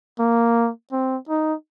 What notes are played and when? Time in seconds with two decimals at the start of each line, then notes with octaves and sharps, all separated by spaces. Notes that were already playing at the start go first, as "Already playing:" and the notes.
0.19 A#3
0.92 C4
1.29 D#4